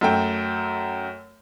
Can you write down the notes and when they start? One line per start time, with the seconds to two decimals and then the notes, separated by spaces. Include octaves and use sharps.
0.01 F#2 A3 G5